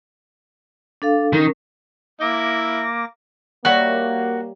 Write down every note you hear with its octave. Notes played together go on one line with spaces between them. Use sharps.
D4 A4 F5
D#3 C#4 A#4
A#3 E4 D6 A#6
G3 A#3 F#4 C#5 E5